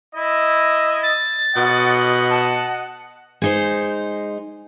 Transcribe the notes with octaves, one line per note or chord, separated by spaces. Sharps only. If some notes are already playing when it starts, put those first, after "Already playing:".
E4 D#5
A6
B2 D#5 F#5
A5
G#3 D#4 C5